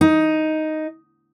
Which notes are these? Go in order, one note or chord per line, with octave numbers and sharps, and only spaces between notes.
D#4